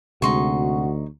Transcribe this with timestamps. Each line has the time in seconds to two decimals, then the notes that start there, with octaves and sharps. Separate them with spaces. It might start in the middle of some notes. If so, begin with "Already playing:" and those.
0.22 D2 C3 G#3 D#4 F#4 C6 C#6